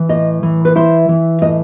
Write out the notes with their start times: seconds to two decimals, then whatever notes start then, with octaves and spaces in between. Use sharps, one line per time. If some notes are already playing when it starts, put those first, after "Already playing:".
Already playing: E3
0.09 A2 D#5
0.43 E3
0.65 B4
0.75 E4 C5
1.09 E3
1.42 A2 D#5